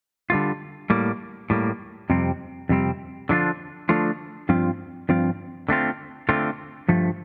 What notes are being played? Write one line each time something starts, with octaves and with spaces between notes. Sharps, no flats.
D3 G3 A#3 F4
A2 G3 A#3
A2 G3 A#3
F2 C3 G3 C4
F2 C3 G3 C4
D3 F3 A3 D4 F4
D3 F3 A3 D4 F4
G2 F3 C4 F4
G2 F3 C4 F4
D3 A3 C4 F4
D3 A3 C4 F4
G2 F3 A3